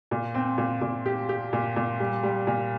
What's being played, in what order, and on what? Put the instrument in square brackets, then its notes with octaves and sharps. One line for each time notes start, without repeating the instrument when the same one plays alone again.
[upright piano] A#2
C4
A#2
A#2
G4
G4
A#2
A#2
G3
G3
A#2